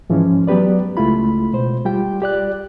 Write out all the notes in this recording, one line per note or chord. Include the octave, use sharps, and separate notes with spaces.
G#2 E3 F3 G#3 C#4
F#3 B3 G4 B4 D5
C#2 G#3 A3 E4 F4 B5
B2 C5
G3 F4 G4 G5
G4 D5 F#6